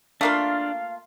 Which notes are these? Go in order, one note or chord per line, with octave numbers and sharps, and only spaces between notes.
A3 A#3 D4 F4 F5